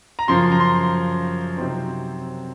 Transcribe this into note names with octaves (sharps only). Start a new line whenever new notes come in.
A#5
F#2 C#3 F3 C6
A#5
C6
C3 F#3 C4 D#4